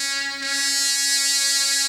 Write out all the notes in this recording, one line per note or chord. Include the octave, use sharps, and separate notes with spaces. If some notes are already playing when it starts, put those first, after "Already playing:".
Already playing: C#4
C#4